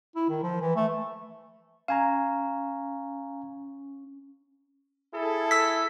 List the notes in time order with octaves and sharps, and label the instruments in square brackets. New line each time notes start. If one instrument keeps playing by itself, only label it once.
[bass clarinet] E4
D#3
F3
E3
A3
[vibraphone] C#4 [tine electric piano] F5 G#5 A#5
[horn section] E4 G#4 A4
[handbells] E6 B6